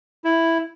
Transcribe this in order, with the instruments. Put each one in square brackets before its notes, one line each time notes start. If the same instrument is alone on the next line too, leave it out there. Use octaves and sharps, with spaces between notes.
[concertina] E4